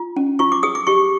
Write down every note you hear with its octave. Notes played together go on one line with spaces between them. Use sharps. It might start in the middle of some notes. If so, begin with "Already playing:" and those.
Already playing: F4
C#4
F4 C#6
D6
G#4 D#6
D6
G4 C#6